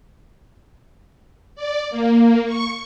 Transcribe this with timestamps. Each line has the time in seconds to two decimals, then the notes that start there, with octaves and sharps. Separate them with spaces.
1.55 D5
1.90 A#3
2.46 C#6